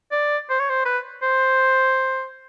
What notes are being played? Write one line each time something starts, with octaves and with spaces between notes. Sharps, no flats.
D5
C5
C#5
C5
B4
C5